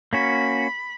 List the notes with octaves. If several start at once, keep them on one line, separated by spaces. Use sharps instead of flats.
A#3 C#4 F#4 B5